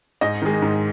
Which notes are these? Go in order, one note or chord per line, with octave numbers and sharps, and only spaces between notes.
G#2 D#5
D#3 G#3
G#2